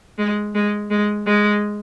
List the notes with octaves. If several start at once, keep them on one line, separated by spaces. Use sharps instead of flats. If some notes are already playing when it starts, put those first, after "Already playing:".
G#3
G#3
G#3
G#3